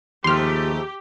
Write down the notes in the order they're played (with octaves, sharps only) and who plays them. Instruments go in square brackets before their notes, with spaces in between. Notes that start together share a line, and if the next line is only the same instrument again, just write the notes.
[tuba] D#2 [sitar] G#2 F3 A3 [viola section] G4 [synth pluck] C6 F6